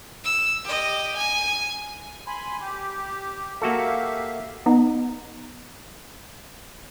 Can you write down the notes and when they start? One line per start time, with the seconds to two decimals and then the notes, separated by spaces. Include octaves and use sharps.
0.24 E6
0.64 G4 D#5
1.16 G#5
2.27 G#5 B5 C6
2.61 G4
3.62 A#3 F#4 G4 A4 E5 F5
4.66 B3 D#4